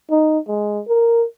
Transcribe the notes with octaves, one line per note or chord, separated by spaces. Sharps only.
D#4
G#3
A#4